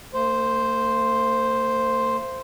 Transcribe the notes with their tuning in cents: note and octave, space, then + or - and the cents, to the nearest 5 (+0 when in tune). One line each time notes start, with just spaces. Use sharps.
A#3 -45 C5 +0